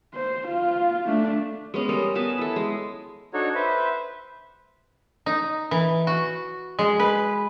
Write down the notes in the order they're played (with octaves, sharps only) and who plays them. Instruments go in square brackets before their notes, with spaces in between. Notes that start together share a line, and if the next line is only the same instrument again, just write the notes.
[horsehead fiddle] C5
F4
A3 D4
[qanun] G#3 B3 C#4
G3 A4 A#4 D#5
B3 B4 G#5 A5
E4 A4
G#3
[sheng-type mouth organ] D4 D#4 F#4 A4 C#5
B4 C5 E5
[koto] D#4
E3
F#4
G#3
B4